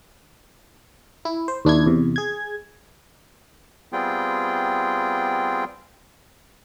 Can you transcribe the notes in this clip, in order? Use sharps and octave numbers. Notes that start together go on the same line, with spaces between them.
E4
C5
D#2 D4 E4 G#6
E2 C3
G#4 G#6
G3 B3 C4 F4 G#4 G5